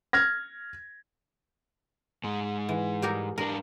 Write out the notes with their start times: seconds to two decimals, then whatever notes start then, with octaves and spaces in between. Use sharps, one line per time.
0.13 F6 G#6 A#6
2.24 G#2 G#3
2.69 E3
3.02 G3 G4 A#4
3.38 G#2 D4 A#4